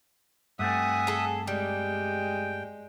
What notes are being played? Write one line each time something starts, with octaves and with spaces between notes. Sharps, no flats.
G2 A3 C4 E5 F#5 G#5 D#6
G#4 A4
G3 G#3 G5